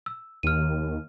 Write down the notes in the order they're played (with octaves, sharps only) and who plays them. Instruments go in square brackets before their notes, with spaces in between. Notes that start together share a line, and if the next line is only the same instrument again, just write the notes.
[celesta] E6
[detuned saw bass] D#2 [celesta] F6 D#7